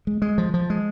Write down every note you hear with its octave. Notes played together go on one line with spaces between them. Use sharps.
G#3
G#3
F3
F3
G#3